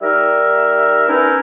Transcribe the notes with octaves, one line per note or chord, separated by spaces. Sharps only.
G3 D#4 A#4 E5
B3 C#4 D#4 E4 A#4